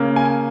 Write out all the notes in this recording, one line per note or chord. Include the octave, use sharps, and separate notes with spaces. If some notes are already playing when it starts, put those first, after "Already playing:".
Already playing: C#3 A#3 C#4
G#5